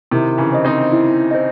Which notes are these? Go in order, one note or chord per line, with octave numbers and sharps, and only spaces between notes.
C3 D#3 E4
C#3 E3
C5 D#5
C4 D#4
E4
C5 D#5